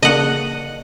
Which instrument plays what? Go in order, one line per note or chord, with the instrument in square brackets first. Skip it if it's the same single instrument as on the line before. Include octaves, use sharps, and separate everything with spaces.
[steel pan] C#3 A#3 D4 [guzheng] D#5 F#5